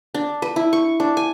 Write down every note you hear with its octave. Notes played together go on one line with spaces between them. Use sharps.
D4
B4
E4
C#6
D4
G#5